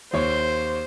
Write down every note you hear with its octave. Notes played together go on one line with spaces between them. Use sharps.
D#2 C5 C#5